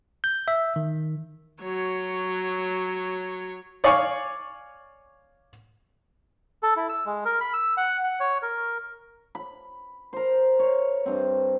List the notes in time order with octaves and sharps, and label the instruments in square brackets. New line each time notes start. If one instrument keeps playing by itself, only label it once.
[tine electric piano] G6
E5
D#3
[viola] F#3 C#5
[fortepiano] C#5 D5 F5 G#5 C#6 D6
[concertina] A4
E4
E6
G#3
A#4
B5
E6
F#5
F#5
C#5
A#4
[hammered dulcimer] B5
A#4 C5
C#5
G2 C4